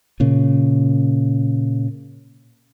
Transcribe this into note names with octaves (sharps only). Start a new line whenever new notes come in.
A#2 C#3